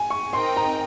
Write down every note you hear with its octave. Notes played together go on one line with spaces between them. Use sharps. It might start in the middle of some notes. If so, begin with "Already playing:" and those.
Already playing: G#5
C#6
C4 D#4 A#4 D#5 G5 C6
A#5